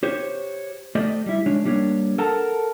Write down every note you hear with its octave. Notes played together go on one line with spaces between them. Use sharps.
G4 C5 C#5
A3 G4 C5 D5 D#5
G3 E4
G#3 D4 C#5
G3 A#3 D4 C#5
A4 A#4 F#5 A5 A#5